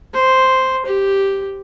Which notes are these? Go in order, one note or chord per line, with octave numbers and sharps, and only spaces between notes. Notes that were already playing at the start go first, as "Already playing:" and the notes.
C5
G4